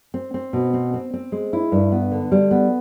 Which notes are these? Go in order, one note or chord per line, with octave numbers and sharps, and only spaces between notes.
C4
C4
B2
C4
C4
C4
G#3
E4
G2
B3
D3
G3
B3